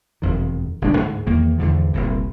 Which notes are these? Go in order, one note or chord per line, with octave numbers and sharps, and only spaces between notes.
E1 F2 D#3
G1 B2 G#3 D4
D2 G#2
E2 D#3 A#3
E2 G#2 D3 F3
F1 C2 A#2